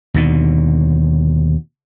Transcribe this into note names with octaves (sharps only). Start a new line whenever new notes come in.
D#2 B2 D3